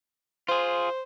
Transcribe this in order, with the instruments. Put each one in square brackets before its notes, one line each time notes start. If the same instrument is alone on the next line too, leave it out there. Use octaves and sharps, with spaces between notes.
[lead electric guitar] F4 G#4 [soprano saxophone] C5